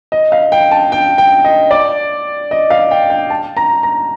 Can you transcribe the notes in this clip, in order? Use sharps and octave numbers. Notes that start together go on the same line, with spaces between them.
D#5
F5
G5
A5
G5
G5
D#5
D5
D#5
F5
G5
G5
A5
A#5
A#5